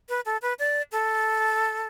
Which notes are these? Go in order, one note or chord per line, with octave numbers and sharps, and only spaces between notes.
B4
A4
B4
D5
A4